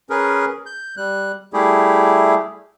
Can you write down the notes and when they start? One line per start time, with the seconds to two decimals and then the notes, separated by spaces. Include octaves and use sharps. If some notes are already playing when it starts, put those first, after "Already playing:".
0.10 C#4 G#4 A#4 B4
0.66 G6
0.97 G3 F#6
1.53 G3 A3 E4 G4 G#4